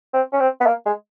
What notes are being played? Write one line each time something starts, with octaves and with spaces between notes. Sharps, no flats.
C4
C#4
C4
B3
A#3
G#3